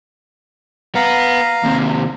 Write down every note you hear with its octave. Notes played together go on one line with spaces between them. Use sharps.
B3 F5 A#5
D#2 C3